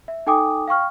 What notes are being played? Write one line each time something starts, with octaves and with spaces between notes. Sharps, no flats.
E5
D#4 A4 G5 G#5 D6 D#6
F5 G5 C#6 F6